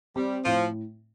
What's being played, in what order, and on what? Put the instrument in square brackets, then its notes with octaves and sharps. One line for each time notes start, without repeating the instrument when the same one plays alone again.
[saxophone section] G3 [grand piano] C4
[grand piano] A2 [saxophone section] F3